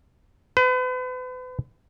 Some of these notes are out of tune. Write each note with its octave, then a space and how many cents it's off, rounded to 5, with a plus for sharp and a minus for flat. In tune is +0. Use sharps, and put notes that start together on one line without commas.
B4 +40